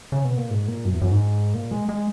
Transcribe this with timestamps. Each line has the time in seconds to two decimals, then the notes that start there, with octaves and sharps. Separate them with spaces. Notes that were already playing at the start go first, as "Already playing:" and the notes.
0.12 C#3
0.25 B2
0.37 A#2
0.51 G#2
0.68 A#2
0.85 F#2
0.93 E2
1.02 F#2
1.11 G#2
1.54 A#2
1.71 G#3
1.89 G#3